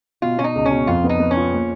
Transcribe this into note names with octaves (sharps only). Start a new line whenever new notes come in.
B2 F4
B2 C#4
D#4
C#2
C#4
B2
F2 F4
B3
D#4
B3
C#4
F4
A#3